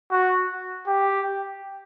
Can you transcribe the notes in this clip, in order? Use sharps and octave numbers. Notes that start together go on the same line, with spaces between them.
F#4
G4